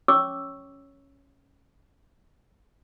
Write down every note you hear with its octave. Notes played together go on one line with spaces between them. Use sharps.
C#4 C#5 C#6 D6 E6